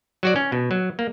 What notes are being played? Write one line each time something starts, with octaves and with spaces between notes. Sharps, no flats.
F#3 F#4 D5
C#4
B2
F#3
A#3